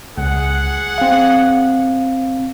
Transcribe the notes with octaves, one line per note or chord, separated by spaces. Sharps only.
C#2 G#4 F#5
C4 F5